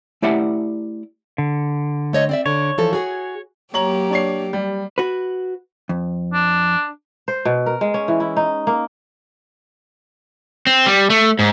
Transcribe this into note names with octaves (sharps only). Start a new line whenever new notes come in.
A3 E4 G4 D5 E5 F#5
D3
A3 C#5 D#5
C4 D5 E5
D3 C#5
E3 F3 A4
F#4 G#4
F#3 A#3 G4 C#5 A#5 F#7
D4 C#5 C7
G3
F#4 B4
F2
D4
C5
B2
A#4
G#3
C#4
E3
E4
D#4
A#3
C4
G3
A3
G#2